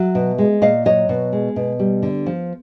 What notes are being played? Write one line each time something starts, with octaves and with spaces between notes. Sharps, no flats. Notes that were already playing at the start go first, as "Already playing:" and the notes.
Already playing: F#3 E5
B2
G#3
A#2 D#5 F5
F#3 C#5 D#5
B2
G#3
B2
G3
D3
F3